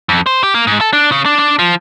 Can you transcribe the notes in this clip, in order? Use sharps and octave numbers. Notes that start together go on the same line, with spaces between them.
F2
C5
G4
A#3
G#2
A4
D4
C#3
D4
D4
F3